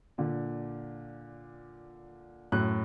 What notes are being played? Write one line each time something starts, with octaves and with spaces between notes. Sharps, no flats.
A#2 D3
F#2 A2 F#6